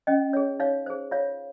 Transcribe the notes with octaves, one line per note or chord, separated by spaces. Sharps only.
C#4 D#5 G5
G#4 C#5
D#4 C#5 F5
G#4 C5
F4 C#5 F5